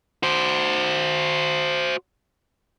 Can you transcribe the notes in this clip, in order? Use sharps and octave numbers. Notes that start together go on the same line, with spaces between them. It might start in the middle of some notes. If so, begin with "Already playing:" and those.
F#4 C5